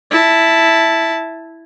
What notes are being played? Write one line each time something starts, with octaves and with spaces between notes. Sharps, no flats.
E4 A5